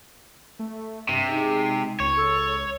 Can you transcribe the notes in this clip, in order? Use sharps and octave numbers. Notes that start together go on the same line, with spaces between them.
A3
G2 C3
G#3 D#4
C#2 C#5
A4